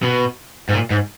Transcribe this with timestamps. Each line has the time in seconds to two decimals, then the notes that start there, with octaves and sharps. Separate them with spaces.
0.03 B2
0.69 G#2
0.73 A#2
0.90 G#2